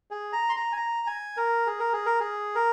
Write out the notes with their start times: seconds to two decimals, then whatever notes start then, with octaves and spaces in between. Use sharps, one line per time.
0.11 G#4
0.33 A#5
0.49 C6
0.56 A#5
0.72 G#5
0.77 A#5
1.07 G#5
1.37 A#4
1.67 G#4
1.80 A#4
1.93 G#4
2.06 A#4
2.20 G#4
2.55 A#4